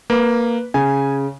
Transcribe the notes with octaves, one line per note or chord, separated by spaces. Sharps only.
A#3 B4
C#3 G#5